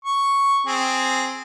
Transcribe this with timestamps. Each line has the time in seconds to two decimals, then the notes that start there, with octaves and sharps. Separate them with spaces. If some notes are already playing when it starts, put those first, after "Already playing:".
0.05 C#6
0.67 C4 G#4